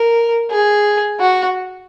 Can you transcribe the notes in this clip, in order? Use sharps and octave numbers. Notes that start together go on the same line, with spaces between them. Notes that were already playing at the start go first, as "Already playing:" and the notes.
Already playing: A#4
G#4
F#4